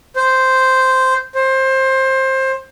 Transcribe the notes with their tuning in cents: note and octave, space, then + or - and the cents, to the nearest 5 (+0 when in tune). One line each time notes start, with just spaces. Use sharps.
C5 -5
C5 +20